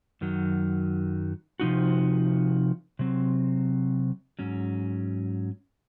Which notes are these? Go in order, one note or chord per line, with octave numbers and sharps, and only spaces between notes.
F#2 D#3 F#3
C3 F3 G#3 D#4 F#4
C3 F#3 C4
G#2 F#3 C#4